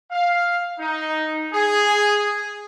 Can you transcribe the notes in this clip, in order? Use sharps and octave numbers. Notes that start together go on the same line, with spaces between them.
F5
D#4
G#4